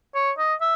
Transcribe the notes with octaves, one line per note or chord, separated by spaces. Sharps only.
C#5
D#5
E5